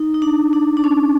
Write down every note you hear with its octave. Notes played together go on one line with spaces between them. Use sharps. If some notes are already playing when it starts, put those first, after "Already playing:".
Already playing: D#4
D#4
D4
D4
D4
C#4